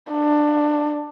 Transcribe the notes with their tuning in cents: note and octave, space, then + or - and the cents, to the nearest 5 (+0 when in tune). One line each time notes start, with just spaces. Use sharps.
D4 +15